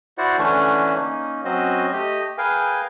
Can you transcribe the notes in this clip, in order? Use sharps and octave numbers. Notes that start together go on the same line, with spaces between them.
E4 F#4 C5 D5 F#5
D3 E3 A3 C#4 D4
A#3 C#4 D#4
F#3 C4 C#4 F#4 C5 D#5
A3 G4 D#5
G#4 A#4 B4 F5 G5 G#5